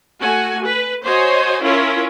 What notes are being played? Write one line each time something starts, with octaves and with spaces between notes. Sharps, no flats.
A3 F#4 G#5
B4
F#4 C5 C#5 D#5 G#5
C#4 E4 F4 A#4 C#5